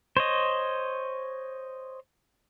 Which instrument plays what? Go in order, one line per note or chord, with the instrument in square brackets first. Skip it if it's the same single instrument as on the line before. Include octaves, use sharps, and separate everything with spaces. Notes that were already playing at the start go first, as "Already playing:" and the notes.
[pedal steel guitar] C5 C#5 D#5